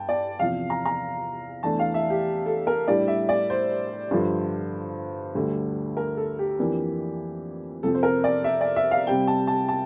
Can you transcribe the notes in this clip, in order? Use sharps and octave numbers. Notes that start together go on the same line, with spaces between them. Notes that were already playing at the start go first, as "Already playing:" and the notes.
Already playing: G2 G5 A5
D5
E2 C3 F3 F5
A#5
A#5
E2 E3 A3 D4 A5
F5
E5
G4
A4
A#4
A2 G3 D4 D5
E5
D5
C5
G2 D3 F3
D2 D3 G3
A#4
A4
G4
F2 E3 A#3 D4
F2 C3 F3 C4 A4
C5
A#4
D5
E5
D5
E5
F5
C3 G3 C4 G5
A5
A5
A5